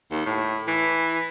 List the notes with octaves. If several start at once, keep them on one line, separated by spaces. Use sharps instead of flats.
D#2
A2
E3